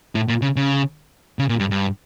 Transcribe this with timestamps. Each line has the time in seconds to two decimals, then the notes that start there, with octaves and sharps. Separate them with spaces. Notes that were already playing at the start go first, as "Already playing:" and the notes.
0.15 A2
0.28 A#2
0.42 C#3
0.56 C#3
1.39 C#3
1.49 A#2
1.59 G2
1.71 G2